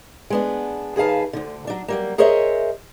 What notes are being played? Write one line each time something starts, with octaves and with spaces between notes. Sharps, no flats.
G#3 B3 D4
D#2 G#4 B4 F5 A5
D2 A#2 D3
F#3 D4
F#3 G3 A#3
G#4 A#4 C5 C#5 D#5 E5